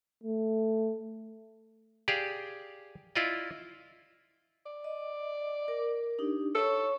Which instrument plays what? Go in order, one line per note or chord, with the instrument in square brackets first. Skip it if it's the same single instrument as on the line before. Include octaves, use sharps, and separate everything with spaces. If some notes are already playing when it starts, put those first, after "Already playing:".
[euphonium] A3
[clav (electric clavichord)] G4 G#4 D5 F5
E4 F4 D5 D#5
[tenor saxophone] D5
[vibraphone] D#5
A#4
D4 D#4 G4
[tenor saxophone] A4 [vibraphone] C#5 C#6